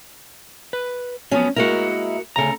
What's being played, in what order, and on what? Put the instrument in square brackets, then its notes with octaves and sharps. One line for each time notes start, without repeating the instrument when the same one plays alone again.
[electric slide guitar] B4
[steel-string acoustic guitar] F3 C#4 [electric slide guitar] F#3 B3
[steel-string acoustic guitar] G#3 A#3 E4 [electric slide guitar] F#4 A#4
[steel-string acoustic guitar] D2 C#3 [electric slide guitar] A4 A#5